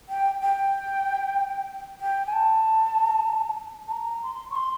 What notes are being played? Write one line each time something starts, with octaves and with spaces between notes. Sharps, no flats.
G5
G5
G5
G#5
A5
A5
A#5
C6
C#6
C6